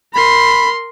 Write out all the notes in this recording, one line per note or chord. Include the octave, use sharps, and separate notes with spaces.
A#4 B5 C6